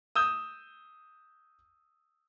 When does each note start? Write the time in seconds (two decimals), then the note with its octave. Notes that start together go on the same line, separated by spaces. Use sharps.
0.16 D#6 E6 G6